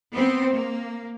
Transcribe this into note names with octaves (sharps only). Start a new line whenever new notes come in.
B3 C4
A#3